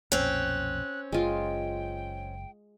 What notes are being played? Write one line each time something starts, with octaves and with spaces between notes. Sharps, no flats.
B1 F2 A#2 C4 C#4 F#6
F#1 G#3 F4 G5